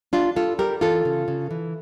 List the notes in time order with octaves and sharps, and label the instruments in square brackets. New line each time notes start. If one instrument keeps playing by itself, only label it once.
[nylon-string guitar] G3 D4 F4
G3 F4 A4
G3 G4 A#4
E3 F4 A4
C#3
C#3
E3